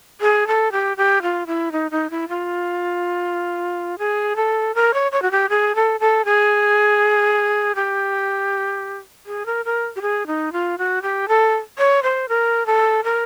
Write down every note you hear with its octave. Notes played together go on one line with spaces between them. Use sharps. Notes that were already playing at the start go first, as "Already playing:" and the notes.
G#4
A4
G4
G4
F4
E4
D#4
D#4
E4
F4
G#4
A4
A#4
C#5
C#5
F#4
G4
G#4
A4
A4
G#4
G4
G#4
A#4
A#4
G4
G#4
D#4
F4
F#4
G4
A4
C#5
C5
A#4
A4
A#4